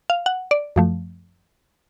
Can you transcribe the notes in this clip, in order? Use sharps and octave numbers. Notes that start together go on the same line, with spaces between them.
F5
F#5
D5
F#2 F3 A3